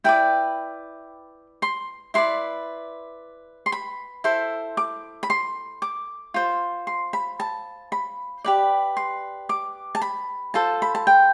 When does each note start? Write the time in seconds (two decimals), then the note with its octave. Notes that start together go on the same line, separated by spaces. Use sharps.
0.04 E4 B4 D5 G5
1.62 C6
2.14 E4 B4 D5 C6
3.66 C6
3.72 B5
4.24 E4 A4 C5
4.77 D6
5.23 B5
5.30 C6
5.82 D6
6.34 F4 C5
6.87 C6
7.13 B5
7.40 A5
7.92 B5
8.44 G4 B4 D5
8.97 C6
9.49 D6
9.95 A5
10.02 B5
10.54 F4 A4 C5 A5
10.82 B5
10.95 A5
11.07 G5